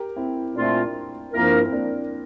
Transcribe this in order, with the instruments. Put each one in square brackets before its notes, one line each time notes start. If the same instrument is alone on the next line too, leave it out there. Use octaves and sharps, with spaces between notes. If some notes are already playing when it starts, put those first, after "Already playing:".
Already playing: [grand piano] G4 A#4
C4 E4
[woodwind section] A#2 A3 C4 F4 [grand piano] A#3 D4
[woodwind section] G2 F3 A#3 F4 A#4 [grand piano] C4 E4
[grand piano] C4
A#3 D4